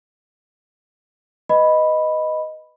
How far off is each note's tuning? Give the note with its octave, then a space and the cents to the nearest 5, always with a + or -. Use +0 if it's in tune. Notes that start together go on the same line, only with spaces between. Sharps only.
B4 +0 D#5 +0 B5 +0